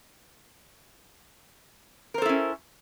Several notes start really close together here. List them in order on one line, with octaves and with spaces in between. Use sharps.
A#4 C5 A4 E4 C#4